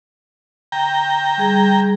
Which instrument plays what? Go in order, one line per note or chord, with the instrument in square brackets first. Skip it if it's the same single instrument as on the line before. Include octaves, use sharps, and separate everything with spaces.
[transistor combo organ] G5 A#5
[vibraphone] G3 G#4